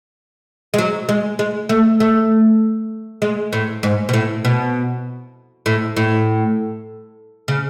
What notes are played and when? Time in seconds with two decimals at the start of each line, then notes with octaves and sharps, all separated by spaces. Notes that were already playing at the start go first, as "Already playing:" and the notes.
0.74 G#3
0.78 F#3
1.09 G#3
1.39 G#3
1.69 A3
2.00 A3
3.22 G#3
3.53 A2
3.83 G#2
4.09 B2
4.13 A2
4.45 B2
5.66 A2
5.97 A2
7.48 C#3